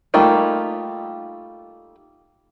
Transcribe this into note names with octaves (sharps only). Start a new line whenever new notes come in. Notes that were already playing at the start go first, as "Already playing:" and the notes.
G3 A3 A#3 D#4 F4